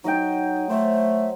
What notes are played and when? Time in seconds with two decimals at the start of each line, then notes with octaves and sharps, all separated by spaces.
0.04 F#3 D#4 D#5 G5
0.69 A3 C5 E5